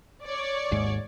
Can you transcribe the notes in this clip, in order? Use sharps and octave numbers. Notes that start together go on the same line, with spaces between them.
C#5 D5
G#1 D#2 G#2